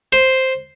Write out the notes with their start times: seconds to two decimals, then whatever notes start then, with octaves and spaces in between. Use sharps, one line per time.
0.12 C5